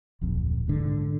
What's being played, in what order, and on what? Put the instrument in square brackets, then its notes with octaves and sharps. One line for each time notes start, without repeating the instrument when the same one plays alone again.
[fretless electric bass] D1 A#1 F2
G#2 D3